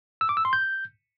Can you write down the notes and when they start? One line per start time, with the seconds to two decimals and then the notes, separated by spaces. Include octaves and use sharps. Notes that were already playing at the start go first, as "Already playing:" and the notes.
0.21 E6
0.29 D6
0.37 E6
0.45 C6
0.53 G6